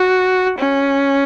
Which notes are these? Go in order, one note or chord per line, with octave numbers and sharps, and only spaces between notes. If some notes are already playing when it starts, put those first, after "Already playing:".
Already playing: F#4
C#4